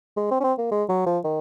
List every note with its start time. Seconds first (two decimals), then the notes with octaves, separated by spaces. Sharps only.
0.17 G#3
0.31 C4
0.40 C#4
0.44 C4
0.58 A#3
0.71 G#3
0.89 F#3
1.06 F3
1.24 D#3